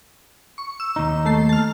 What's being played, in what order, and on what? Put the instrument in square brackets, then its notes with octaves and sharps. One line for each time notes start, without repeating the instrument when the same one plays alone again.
[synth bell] C#6
E6
[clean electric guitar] D#2 D#4
[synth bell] A3 A5 C7
A5 F6